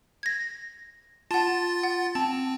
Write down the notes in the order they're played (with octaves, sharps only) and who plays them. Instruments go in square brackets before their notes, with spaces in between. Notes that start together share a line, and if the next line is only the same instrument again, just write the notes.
[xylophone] G#6 A#6
[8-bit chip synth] F4 A6 [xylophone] F#5 A5
[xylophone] F#5
[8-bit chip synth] C4 [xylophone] A5